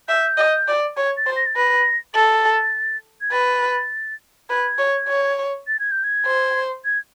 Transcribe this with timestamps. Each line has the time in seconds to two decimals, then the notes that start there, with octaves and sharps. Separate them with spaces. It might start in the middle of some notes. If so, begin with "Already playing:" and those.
0.09 E5 G6
0.38 D#5
0.68 D5
0.97 C#5 G#6
1.17 A6
1.26 C5
1.36 A#6
1.46 A6
1.55 B4 A#6
2.14 A4 A6
3.21 G#6
3.32 B4 A6
4.50 B4 G#6
4.79 C#5
5.08 C#5
5.67 A6
5.80 G#6
5.91 G6
6.04 G#6
6.26 C5
6.85 G#6